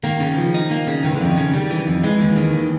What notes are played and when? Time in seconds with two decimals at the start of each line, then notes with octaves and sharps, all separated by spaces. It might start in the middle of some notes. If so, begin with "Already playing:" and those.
0.03 D#3 A#3
0.20 C#3
0.37 F3
0.54 D#4
0.71 A#3
0.87 C#3
1.03 D#3 E3
1.14 D3
1.21 F2 D#3
1.37 C#3
1.54 G3
1.70 E3
1.87 F2
2.03 E3 G#3
2.20 D#2
2.37 D#3
2.53 D#2